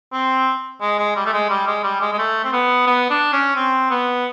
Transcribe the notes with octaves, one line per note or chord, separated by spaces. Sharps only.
C4
G#3
G#3
G3
A3
G#3
G3
G#3
G3
G#3
G#3
A3
C4
B3
B3
D4
C#4
C4
B3